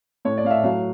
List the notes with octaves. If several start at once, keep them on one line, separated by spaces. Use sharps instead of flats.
A2 C#5
D5
A2 F5
E5
F#3 F5